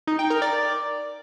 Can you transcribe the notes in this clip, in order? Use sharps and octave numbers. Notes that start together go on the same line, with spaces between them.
D#4
G5
A#4
D5